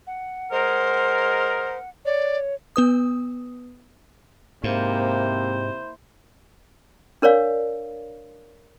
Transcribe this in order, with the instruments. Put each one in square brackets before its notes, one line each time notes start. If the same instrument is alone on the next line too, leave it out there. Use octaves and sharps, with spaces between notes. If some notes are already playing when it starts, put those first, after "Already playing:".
[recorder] F#5
[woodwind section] G#3 A#4 [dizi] C5
[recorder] C#5 [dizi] D5
[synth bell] B3 B4 D#6
[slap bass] G#2 [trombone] C3 [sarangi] A#3 [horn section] E4 C5
[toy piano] D4 A#4 C#5 D5 F5